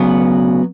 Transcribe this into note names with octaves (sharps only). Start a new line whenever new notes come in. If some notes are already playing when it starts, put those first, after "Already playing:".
Already playing: D2 C#3 F#3 B3